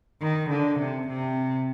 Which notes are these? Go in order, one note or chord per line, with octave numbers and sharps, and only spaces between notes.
D#3
D3
C3
C3